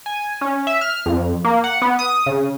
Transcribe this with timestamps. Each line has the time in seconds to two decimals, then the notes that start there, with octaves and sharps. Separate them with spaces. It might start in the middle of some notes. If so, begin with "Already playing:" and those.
0.06 G#5
0.41 C#4
0.67 E5
0.81 F6
1.06 F2
1.45 A#3
1.64 F#5
1.82 B3
1.99 D#6
2.26 C#3